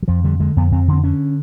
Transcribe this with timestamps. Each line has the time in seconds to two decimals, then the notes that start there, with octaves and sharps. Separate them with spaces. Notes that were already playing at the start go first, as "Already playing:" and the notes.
0.02 F#3
0.08 F2 F3
0.24 D3 G3
0.40 D3 G#3
0.56 F2 B3
0.72 F2 C4
0.88 D3
0.93 C4
1.04 D3 C#4